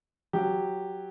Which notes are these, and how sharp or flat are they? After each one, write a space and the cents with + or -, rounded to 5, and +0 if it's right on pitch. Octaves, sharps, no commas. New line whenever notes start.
F#3 +0 G4 +0